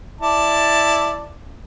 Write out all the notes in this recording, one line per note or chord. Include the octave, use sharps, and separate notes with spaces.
E4 D5 A5